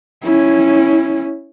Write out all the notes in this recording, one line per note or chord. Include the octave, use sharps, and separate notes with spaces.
C#4 E4